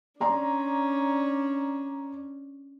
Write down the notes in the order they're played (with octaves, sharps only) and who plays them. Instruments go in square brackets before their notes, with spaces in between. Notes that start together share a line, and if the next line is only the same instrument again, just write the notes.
[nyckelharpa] C#4 D4 [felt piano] D5 A#5 C6